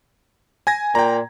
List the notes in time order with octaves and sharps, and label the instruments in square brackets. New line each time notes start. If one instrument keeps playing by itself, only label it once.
[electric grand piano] G#5 G#6 A#6
[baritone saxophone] A#2 [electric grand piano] G5 A#5